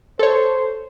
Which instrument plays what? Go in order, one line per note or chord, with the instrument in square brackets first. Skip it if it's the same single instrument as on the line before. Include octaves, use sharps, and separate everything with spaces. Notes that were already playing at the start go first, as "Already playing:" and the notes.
[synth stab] A4 C#5 [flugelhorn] C5